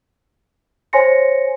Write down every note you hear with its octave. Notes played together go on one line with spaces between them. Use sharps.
C5 C#5 G#5 C6 A#6 C#7